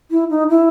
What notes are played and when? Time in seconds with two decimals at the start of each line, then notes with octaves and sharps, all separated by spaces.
0.11 E4
0.30 D#4
0.50 E4